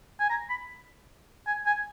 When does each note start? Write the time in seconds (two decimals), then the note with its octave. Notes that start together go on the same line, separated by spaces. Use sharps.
0.20 G#5
0.30 A#5
0.50 B5
1.47 G#5
1.66 G#5